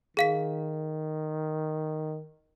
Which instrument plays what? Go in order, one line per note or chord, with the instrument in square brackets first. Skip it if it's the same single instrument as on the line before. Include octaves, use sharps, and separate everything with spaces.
[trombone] D#3 [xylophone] G#4 F5 B6